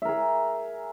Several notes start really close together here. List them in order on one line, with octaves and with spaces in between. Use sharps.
E5 A#4 G#4